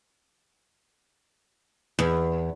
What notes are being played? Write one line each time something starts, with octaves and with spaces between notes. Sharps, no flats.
E2